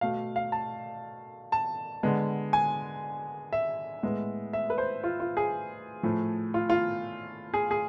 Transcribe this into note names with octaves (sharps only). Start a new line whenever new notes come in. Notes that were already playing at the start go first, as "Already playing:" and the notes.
B2 A3 F5
F5
A5
A5
D3 G#3 B3
G#5
E5
A2 G#3 B3
E5
B4
C5
F4
F4
G#4
A2 F3 A3
F4
F4
G#4
G#4